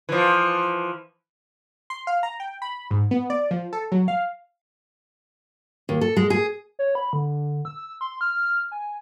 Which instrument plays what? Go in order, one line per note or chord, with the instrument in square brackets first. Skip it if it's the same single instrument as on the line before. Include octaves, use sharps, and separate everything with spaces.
[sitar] E3 F3
[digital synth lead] C6
F5
A#5
G5
B5
G#2
B3
D5
F3
A4
F#3
F5
[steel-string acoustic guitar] D#2
A4
G#3
G#4
[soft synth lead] C#5
B5
D3
E6
C6
F6
G#5